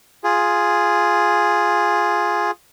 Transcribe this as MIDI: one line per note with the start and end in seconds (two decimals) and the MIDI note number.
0.24 2.51 65
0.24 2.51 68